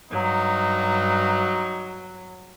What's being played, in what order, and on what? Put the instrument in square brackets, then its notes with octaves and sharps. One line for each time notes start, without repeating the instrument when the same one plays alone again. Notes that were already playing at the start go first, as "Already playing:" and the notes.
[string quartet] G2 [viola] F#3 [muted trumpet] D#4